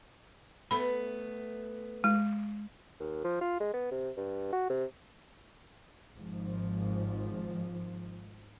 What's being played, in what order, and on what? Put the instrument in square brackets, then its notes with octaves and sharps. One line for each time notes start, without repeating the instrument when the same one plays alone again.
[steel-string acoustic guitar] A3 B3 [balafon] B5
[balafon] G#3
[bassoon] D#2
F3
F4
G#3
B3
C3
G2
F#4
C3
[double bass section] G#1 G#2 F3